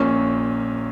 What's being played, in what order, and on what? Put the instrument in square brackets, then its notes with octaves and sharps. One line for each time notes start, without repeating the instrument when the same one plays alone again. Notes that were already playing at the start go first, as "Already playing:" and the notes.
Already playing: [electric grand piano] A#1 A#2 A#3 [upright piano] C#4